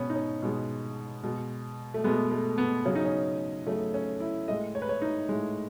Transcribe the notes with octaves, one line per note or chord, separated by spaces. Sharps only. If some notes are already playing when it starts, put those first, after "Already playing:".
Already playing: B2 G#3 B3 C#4
D#4
C#4
B2 G#3
B2 G#3
A3
B2 G#3 B3
A3
B3
C#3 F#3 C#4
D#4
C#4
C#3 F#3 A3
C#4
E4
A2 G#3 D#5
C#5
B4
C#5
D#4
A2 G#3